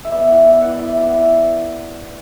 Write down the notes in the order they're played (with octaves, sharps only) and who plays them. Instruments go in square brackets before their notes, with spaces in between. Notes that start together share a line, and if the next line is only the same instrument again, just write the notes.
[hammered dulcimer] E5
B3 D5
E3 F#5
B3 E5
E3 F#5
E3 D5 E5
E3 E5
F#5
E3